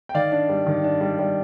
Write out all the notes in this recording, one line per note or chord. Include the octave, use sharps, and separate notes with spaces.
G5
D#3 D5 F5
D4
G3
D#3
D4
G3
G3